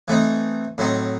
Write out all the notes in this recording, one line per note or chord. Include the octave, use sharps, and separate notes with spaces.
E3 A3 C4 D#4
A2 F#3 C4 D#4